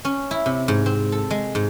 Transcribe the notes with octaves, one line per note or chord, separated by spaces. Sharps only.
C#4
E4
C3
G#2
C4
A4
G#3
G#2